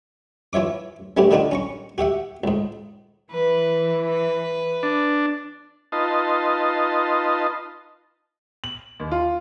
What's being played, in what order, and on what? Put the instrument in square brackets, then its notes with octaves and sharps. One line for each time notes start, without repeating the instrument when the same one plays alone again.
[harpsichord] E3 F4 C#5 E5 D6
G3 A3 B3 C4 F#4 G4
D3 D#3 D4 D#4 F4 F#4
C#4 A#5 C#6
F#4 G4 E5 F#5
C#2 G#2
[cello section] E3 [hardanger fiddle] B4
[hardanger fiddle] B4
[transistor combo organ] D4
D#4 F4 B4 D#5 A5 C6
[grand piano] F#7
D#2
F4